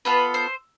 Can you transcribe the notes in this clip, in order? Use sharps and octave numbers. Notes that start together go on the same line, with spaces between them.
B3 F4 A4 B4
C5